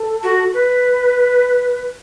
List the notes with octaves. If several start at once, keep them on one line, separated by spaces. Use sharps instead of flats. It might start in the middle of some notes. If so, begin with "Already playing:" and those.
Already playing: A4
F#4
B4